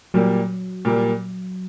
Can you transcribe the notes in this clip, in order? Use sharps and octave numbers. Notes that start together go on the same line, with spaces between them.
A#2 F#3 G3 A#3
A#2 G3 A#3